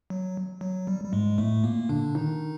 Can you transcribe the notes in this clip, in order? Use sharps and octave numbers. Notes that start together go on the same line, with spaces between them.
F#3
F#3
G3
G3
G#2 G#3
A2 A3
A#2 A#3
D3 D4
D#3 D#4